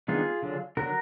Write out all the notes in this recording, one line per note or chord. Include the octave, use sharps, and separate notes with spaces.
D#3 G#3 B3 D4 F4 G#4
D3 F#3 D4
D3 F#3 D4 F#4 A#4